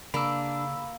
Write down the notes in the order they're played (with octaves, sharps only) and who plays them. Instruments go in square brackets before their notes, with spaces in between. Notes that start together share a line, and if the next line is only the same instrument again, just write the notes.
[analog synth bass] C#3 [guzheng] A#3 A5 [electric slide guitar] D4 [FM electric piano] B5 E6